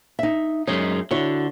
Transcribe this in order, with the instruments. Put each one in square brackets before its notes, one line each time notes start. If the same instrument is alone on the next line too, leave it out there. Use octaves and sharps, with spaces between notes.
[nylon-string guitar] D#4 E5
[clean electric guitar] F#2 G#3 D#4 [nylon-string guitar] C#5
[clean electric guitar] D3 [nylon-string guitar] E4 F#4 C#5